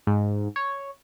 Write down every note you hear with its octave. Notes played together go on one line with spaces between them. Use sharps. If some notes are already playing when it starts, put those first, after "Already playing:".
G#2
C#5